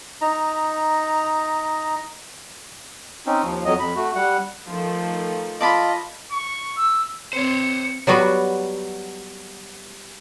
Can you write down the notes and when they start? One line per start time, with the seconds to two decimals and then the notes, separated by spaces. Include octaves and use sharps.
0.21 D#4 A#5
3.26 C4 C#4 D#4
3.43 D#2 F3
3.65 F2 F#3 D#5
3.79 F2 B5
3.96 A3 F#4
4.15 G3 F#5
4.68 D#3 F3 A3
5.61 F4 D5 D#5 A5 B5
6.32 C#6
6.76 E6
7.33 C4 C5 C#5 C#7
8.07 F#3 G3 B3 F#4